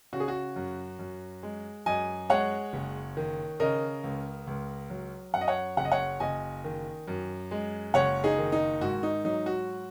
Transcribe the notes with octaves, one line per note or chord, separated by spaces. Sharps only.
C#3 F#4
G#4
F#4
F#2
F#2
G#3
F#2 D#5 G#5
G#3 C#5 F#5
F#1
D#3
C#3 A#4 D#5
C#2
C#2
F#3
F#2 F#5
D#5
C#5 F#5
F#1 F#5
D#5
C#5 F#5
F#1 D#5 G#5
D#3
F#2
G#3
F#1 C#5 F#5
D#4 G#4
D#3
D#4
G#2 F#4
D#4
F#3 D#4
F#4